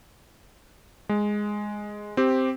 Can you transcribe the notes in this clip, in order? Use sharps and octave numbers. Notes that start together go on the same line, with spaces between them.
G#3
C4 G4